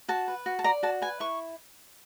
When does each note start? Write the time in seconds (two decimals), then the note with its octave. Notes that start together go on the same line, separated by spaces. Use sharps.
0.08 F#4 A5
0.28 B4
0.46 F#4
0.59 A5
0.64 D5 A#5
0.83 F#4 A5
1.02 B4 G#5
1.20 E4 C#6